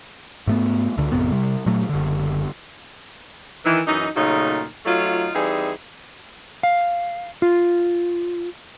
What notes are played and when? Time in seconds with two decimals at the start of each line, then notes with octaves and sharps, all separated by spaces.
0.47 G#2 A3 B3
0.97 C#2 D3
1.12 A1 F2 C3 B3
1.32 C3 G3
1.66 A#2 F#3 A3
1.89 F#1 D3
3.65 D#3 E3
3.87 F#2 E3 D#4
4.16 A#2 C#3 F#3 A3 D#4
4.86 F#3 A3 D#4 F4
5.34 E3 G3 C4 D#4 G#4
6.63 F5
7.42 F4